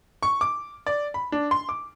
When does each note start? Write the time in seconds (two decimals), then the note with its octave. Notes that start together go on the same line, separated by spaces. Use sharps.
0.23 C#6
0.41 D6
0.87 D5
1.14 B5
1.32 D4
1.51 C6
1.69 D6